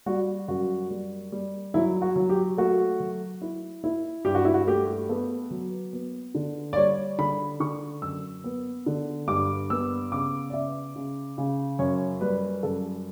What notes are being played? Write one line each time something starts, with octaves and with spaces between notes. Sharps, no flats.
G3 F#4
F#2 F#4
G3
G3
F#3 E4
F#4
F#3
G4
A3 F#4
F#3
E4
E4
G2 G4
F#4
E4
F#4
A3 G4
B3 A4
F#3
B3
D3
D5
G3 C#5
D3 B5
D3 C#6
F#2 E6
B3
D3
G2 D6
B3 E6
C#3 D6
D5
C#3 E5
C#3
C#3
F#2 C#5
G3 B4
F#2 A4